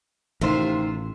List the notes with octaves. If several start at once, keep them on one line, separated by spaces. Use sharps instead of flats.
A1 C3 D#3 F4 C5